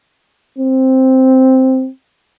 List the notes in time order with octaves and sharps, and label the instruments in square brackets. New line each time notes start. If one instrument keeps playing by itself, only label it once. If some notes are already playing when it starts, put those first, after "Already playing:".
[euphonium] C4